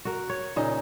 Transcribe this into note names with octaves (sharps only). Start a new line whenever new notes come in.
F#4 A#4
C#5
A#2 C#3 D#4